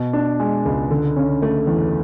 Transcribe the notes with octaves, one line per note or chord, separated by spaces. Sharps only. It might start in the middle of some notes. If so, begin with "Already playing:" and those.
Already playing: B2
D4
G#3
C#2
D3
C#4
A3
E2